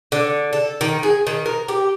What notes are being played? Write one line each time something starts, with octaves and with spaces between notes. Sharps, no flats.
D3
A4
D#3
G#4
D#3
A#4
G4